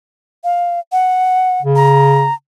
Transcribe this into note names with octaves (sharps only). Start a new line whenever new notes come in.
F5
F#5
C#3
A#5